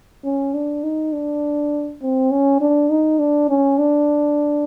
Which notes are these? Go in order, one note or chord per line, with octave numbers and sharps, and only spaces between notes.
C#4
D4
D#4
D4
C4
C#4
D4
D#4
D4
C#4
D4